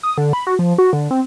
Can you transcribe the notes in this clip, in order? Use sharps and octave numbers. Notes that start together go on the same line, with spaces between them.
D#6
D3
B5
F#4
F3
F#4
D3
C4